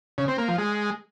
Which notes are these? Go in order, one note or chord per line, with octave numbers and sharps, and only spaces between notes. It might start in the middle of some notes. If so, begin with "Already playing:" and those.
C#3
C4
A#3
F3
G#3